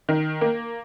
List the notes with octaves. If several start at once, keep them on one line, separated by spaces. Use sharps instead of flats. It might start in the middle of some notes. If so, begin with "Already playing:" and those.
D#3
A#3